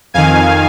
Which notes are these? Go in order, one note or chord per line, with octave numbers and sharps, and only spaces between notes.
F2 D#3 F5 G#5